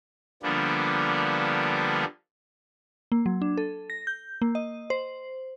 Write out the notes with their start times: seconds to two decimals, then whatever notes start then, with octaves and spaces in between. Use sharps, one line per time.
0.43 D3 F3 G3 A#3 B3 D4
3.12 A#3
3.26 F#3
3.42 D4
3.58 A4
3.90 A#6
4.07 G6
4.42 A#3
4.55 D#5
4.90 C5